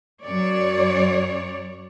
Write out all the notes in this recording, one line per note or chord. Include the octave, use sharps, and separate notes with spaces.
F#2 C#5 D5